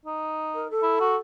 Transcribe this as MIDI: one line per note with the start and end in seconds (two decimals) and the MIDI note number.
0.06 0.68 63
0.54 0.70 70
0.70 1.16 69
0.82 0.98 64
1.00 1.16 66